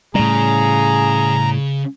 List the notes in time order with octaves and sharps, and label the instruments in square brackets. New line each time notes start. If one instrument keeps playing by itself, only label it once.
[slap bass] A2 G3 [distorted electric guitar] C#3 [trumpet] G#4 [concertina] A#5